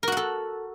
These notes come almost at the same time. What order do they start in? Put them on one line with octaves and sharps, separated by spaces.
A#4 F#4 F#5 A4